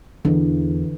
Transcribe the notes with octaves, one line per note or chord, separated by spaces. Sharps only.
E2 D3 E3